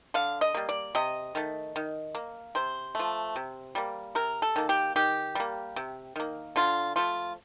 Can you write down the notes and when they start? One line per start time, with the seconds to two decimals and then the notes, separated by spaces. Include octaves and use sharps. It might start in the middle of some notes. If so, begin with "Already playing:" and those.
0.14 D3 F5
0.41 D#5
0.55 G3 A#3
0.69 D5
0.95 C3 D#5
1.35 D#3 A3
1.76 D#3
2.15 A#3
2.55 C3 C5
2.95 F3 A3
3.36 C3
3.75 G3 A#3
4.15 C3 A#4
4.42 A4
4.56 D#3 A#3
4.69 G4
4.96 D#3 G4
5.35 G3 A#3
5.76 C3
6.16 D#3 A#3
6.56 D3 F4
6.96 F3 A3 F4